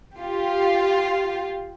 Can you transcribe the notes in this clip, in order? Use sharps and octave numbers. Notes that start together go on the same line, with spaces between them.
F4 G4